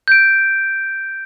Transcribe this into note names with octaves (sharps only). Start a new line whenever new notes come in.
G6 D7